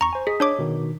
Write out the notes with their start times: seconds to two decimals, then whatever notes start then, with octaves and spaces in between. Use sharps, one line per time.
0.01 E2 A#5 C#6
0.13 C5 G#5
0.27 G#4 D#5 D#6 B6
0.40 D4 C#5 D6
0.59 B2 D#3 D#4